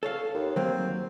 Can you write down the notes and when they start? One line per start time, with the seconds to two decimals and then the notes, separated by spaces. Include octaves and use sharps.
0.03 A4 C#5 F5
0.34 D#2
0.56 D#2 F#3 A#3 C4